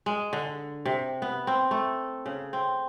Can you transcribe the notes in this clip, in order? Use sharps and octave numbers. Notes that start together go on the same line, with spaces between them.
G#3
D3
C3
B3
C4
A3
C#3
C4